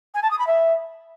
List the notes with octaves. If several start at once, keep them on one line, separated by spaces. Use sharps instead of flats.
G#5
A5
D#6
B5
E5